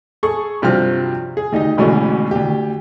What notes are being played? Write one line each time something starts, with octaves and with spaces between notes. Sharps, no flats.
G#4 A4 C#6
G2 C3 F3 F#3 C4 F6
G#4
D2 D#4 G4 D#5
A1 D2 G#2 B2 A3 C#4
D2 G4